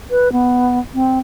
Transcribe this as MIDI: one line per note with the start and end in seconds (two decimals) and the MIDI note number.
0.11 0.31 71
0.32 0.79 59
0.94 1.19 60